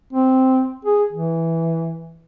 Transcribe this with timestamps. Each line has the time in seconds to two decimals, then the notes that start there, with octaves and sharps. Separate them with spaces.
0.13 C4
0.85 G#4
1.12 E3